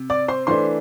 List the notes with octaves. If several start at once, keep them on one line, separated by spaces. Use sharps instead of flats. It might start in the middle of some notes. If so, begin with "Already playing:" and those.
Already playing: C3
D5 D6
C5 C6
E3 A3 D4 C5 C6